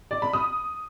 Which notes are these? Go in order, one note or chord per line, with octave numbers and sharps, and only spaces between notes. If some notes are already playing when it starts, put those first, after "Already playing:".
D5
B5
D#6